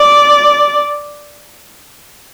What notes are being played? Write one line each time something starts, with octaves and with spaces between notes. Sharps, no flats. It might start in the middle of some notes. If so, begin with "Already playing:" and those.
Already playing: D5